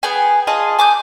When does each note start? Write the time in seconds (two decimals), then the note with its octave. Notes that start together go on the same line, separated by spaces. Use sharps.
0.03 B3 G#4 G5 G#5
0.47 F4 G#4 D#5 A5
0.79 G#5 D6 D#6 G6